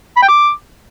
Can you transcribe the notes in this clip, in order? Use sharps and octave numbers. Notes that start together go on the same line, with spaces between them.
B5
G5
D6